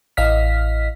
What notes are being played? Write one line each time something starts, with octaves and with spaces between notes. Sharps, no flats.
A1 D#5 F5 F6 B6